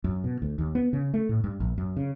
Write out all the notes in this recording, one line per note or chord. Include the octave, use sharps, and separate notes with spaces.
F#2
B2
D2
D#2
B3
C#3
A3
A2
G2
A#1
F#2
C#3